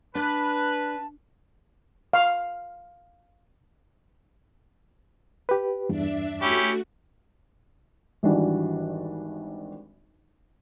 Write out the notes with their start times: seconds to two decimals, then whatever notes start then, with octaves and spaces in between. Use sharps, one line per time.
0.15 D4 B4 A5
2.13 F5
5.49 G4 B4
5.89 E2 G2 D4 E5
6.42 A3 C#4 E4 F#4 G4
8.23 G#1 E3 G3 D4 F#4